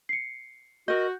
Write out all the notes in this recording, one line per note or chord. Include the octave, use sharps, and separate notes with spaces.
C7 C#7
F#4 A#4 D#5 G6